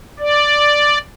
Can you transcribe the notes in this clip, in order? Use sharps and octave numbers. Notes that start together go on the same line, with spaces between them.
D5